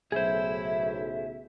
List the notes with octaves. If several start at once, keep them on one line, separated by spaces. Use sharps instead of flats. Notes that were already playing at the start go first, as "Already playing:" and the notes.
B1 A2 C#3 E4 G#4 A4 C5 E5